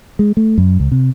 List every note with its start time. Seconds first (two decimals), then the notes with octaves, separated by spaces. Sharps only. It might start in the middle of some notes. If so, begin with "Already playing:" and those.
0.19 G#3
0.37 A3
0.58 F#2
0.80 C#2
0.92 C3